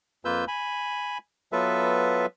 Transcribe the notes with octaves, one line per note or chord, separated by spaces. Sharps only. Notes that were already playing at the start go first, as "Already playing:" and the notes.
F2 A#3 F4 B4 E6 G6
G#5 B5
F#3 B3 F4 A4 B4 E5